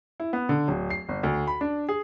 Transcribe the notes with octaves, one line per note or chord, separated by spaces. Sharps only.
E4
B3
D3
D1
C7
G1
D2
B5
D4
G#4